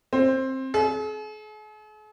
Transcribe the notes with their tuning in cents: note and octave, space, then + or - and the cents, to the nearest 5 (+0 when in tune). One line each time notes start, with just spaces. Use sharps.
C4 +15
G#4 +45